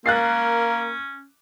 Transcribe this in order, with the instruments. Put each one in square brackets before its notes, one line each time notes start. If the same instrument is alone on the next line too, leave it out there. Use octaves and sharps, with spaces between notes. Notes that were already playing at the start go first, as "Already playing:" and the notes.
[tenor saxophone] A#3 [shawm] C#4 [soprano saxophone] A#4 [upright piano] F#6 A6 C7